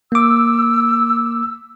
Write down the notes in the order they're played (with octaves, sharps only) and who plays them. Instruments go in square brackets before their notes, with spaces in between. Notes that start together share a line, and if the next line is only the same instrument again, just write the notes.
[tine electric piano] A#3 D6 [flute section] E6